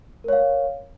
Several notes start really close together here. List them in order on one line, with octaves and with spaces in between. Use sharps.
A#4 C#5 F5